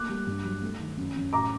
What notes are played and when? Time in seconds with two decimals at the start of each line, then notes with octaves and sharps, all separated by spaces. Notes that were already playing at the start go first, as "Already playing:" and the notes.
Already playing: A3 A#3 D6 F#6
0.09 G3
0.27 G2
0.45 F#3
0.62 A3
0.80 D#3
0.97 F#2
1.16 F#2
1.33 A2 A#5 D6